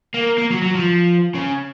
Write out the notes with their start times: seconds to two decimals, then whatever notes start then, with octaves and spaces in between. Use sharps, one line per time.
0.14 A#3
0.38 A#3
0.51 F#3
0.62 F#3
0.75 F3
1.35 C#3